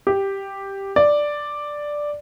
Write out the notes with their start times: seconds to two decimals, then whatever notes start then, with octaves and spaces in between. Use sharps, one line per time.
0.07 G4
0.96 D5